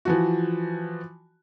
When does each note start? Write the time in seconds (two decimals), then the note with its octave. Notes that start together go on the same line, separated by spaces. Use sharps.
0.05 E3 F3 F#4